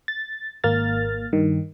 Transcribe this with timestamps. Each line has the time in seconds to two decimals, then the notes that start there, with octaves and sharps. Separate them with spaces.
0.08 A6
0.64 G#1 A#3 F6 A6
1.33 G2 D#3